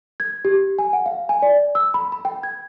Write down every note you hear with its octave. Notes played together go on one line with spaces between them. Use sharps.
G#6
G4
G#5
F#5
F5
G#5
D5
E6
B5
B5
G5
G#6